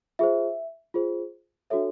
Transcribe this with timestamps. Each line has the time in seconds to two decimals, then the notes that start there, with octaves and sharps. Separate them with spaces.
0.19 F4 G#4 C5 E5
0.94 F4 G#4 C5
1.70 D4 F#4 A4 C#5 E5